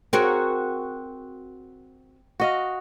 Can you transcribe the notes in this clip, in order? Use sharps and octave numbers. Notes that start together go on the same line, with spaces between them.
C4 F#4 G#4 A#4
F#4 D#5 F5